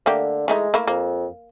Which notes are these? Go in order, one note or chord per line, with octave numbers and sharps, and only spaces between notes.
D3 A3 A#3 G4
E3 G#3 A3 D#4
A3 A#3 E4
F2 A#3